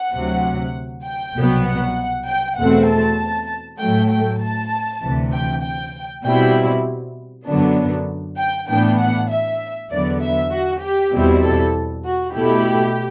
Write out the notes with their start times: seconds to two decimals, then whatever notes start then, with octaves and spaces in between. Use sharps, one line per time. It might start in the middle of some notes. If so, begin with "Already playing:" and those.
Already playing: F#5
0.12 D2 C3 F#3
1.04 G5
1.34 C2 B2 F#3 B3
1.65 F#5
2.26 G5
2.58 E2 B2 A3 C4 F#5
2.88 A5
3.79 A2 F#3 A3 G5
4.10 G5
4.40 A5
5.02 D2 C3 E3
5.32 G5
5.63 G5
6.24 B2 G3 C4 E4 G5
7.46 F#2 D3 F#3 B3 D4
8.38 G5
8.68 A2 E3 B3 D4 G5
8.99 F#5
9.30 E5
9.90 E2 D3 F#3 B3 D5
10.21 E5
10.52 F#4
10.81 G4
11.12 E2 B2 G3 C4 E4
11.43 A4
12.05 F#4
12.34 B2 A3 E4 G4